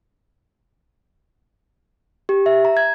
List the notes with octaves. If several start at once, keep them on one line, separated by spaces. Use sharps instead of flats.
G4
E5
A#5
G#6